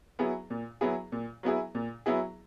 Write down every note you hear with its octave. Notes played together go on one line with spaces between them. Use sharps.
F#3 B3 E4 G#4
A#2
F#3 B3 E4 G#4
A#2
F#3 B3 E4 G#4
A#2
F#3 B3 E4 G#4